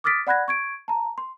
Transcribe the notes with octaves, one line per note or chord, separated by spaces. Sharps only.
D6 D#6 F6 A6 B6 D7
D5 F#5 B5 F#6 G#6 A#6
C#6 G#6 D7
A5 A#5
C6